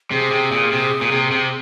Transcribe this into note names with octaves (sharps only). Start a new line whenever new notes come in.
C3 G#4
C3
A#2
C3
A#2
C3
C3